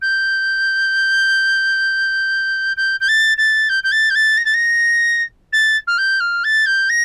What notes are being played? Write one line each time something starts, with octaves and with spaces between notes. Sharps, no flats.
G6
G6
G6
A6
A6
G6
G6
A6
G6
A6
A#6
A6
A#6
A6
F6
G6
F6
A6
G6
A#6